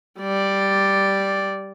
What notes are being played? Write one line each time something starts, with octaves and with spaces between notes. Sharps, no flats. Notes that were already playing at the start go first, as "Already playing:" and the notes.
G3 D5